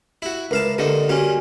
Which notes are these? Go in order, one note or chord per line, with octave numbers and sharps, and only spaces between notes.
E4 F#4
C#2 A#4 B4 E5 F5 A5
D3 A#3 D#4 G4
G3 A#3 C#4 F#4 G#5